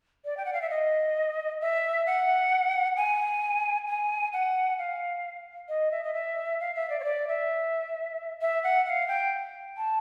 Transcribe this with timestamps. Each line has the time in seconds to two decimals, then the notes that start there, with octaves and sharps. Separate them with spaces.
0.25 D5
0.37 G5
0.45 F#5
0.53 F5
0.62 E5
0.70 D#5
1.61 E5
2.06 F#5
2.97 G#5
3.87 G#5
4.33 F#5
4.78 F5
5.69 D#5
5.91 E5
6.04 D#5
6.14 E5
6.60 F5
6.75 E5
6.90 D5
7.00 C#5
7.04 D5
7.28 E5
8.41 E5
8.64 F#5
8.86 F#5
8.90 F5
9.08 G5
9.77 A5